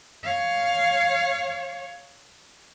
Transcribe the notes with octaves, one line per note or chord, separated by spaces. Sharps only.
C#5 F5